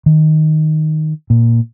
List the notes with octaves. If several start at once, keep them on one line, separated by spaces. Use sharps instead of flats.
D#3
A#2